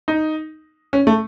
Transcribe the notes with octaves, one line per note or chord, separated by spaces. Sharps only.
D#4
C#4
A3